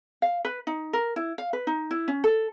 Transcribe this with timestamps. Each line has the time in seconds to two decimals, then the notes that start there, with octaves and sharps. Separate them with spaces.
0.22 F5
0.45 B4
0.67 D#4
0.93 A#4
1.16 E4
1.38 F5
1.53 B4
1.67 D#4
1.91 E4
2.08 C#4
2.24 A4